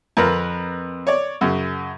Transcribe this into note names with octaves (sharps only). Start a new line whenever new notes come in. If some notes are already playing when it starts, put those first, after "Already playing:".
F2 A#4 B4
C#5 D5
F#2 C#3